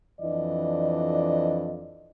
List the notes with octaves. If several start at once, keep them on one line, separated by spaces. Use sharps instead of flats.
F2 E3 D4 D5 D#5